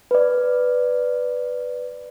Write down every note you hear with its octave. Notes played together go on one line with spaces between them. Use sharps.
B4 D5